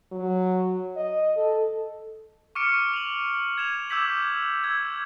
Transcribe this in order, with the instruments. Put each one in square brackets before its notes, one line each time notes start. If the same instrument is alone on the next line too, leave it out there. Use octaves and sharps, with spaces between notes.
[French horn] F#3
D#5
A4
[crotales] C#6 D6 F6 C#7 D7
F7 F#7
G#6 E7 F7
D6 E6 G6 G#6 B6 F#7
E6 G#6